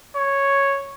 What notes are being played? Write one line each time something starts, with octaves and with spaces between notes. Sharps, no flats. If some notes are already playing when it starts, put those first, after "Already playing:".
C#5